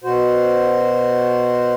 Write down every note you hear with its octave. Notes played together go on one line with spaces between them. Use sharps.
B2 F#4 C5